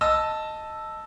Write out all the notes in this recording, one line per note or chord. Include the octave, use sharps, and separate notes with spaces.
D#5 A5 E6